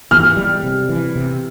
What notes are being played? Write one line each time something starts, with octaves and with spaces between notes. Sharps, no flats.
E3 F6
G3
C3
E3
C3